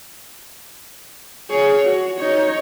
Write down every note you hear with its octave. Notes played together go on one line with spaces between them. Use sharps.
G#4 C#5
F#4
D#4 C#5